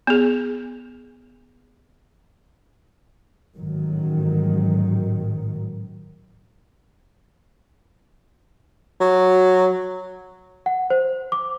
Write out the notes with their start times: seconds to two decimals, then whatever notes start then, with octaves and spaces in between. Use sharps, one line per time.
0.07 B3 G#4
3.56 A1 G#2 D#3 F#3
9.01 F#3
10.66 F#5
10.90 C5
11.32 D6